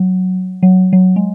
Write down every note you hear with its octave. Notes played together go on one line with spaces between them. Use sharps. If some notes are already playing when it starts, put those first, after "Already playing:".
Already playing: F#3
F#3
F#3
G#3